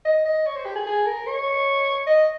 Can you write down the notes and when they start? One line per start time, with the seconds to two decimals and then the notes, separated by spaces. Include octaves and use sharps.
0.05 D#5
0.25 D#5
0.46 C#5
0.56 C5
0.65 G4
0.75 G#4
0.86 G#4
1.06 A#4
1.27 C#5
2.06 D#5